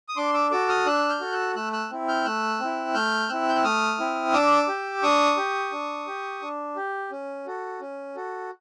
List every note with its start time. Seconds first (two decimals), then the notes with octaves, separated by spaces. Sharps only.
0.09 D#6
0.16 D4 C6 D6
0.34 D6 E6
0.51 F#4 A4 D6 E6
0.68 D#6 F6
0.86 D4 E6 F#6
1.09 F6 G6
1.20 F#4 A4
1.32 E6 F#6
1.55 A3 E6 F#6
1.73 E6 F#6
1.91 C4 E4
2.08 F6 G6
2.25 A3 E6 F#6
2.60 C4 E4
2.94 A3 F6 G6
3.29 C4 E4 E6 F#6
3.49 G6
3.56 F#6
3.64 A3 D#6 F6
3.99 C4 E4
4.33 D4 D6 E6
4.68 G4
5.03 D4 C#6 D#6
5.37 G4
5.72 D4
6.07 G4
6.42 D4
6.76 G4
7.11 C#4
7.46 F#4 A4
7.81 C#4
8.15 F#4 A4